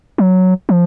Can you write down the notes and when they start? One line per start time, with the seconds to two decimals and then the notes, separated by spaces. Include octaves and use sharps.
0.18 F#3
0.69 F3